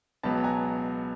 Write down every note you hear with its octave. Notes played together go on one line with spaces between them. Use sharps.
C#2 B2 F#3 B3 A5 B5
G#5 A#5